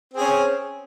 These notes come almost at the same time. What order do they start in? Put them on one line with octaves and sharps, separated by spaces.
C4 G#4 C#4